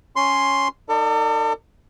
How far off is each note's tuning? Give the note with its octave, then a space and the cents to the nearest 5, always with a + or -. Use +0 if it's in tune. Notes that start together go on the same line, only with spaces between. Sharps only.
C#4 +0 C#5 +0 C6 +0
D#4 -25 A4 +40 D5 +0